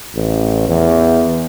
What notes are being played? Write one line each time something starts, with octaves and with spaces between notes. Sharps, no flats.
A1
E2